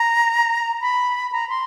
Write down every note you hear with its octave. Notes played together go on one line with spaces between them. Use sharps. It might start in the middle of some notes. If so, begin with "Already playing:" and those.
Already playing: A#5
B5
A#5
C6